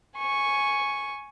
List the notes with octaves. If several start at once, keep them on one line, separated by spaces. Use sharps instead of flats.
G#5 C#6